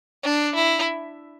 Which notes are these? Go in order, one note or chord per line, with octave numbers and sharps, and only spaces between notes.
D4
E4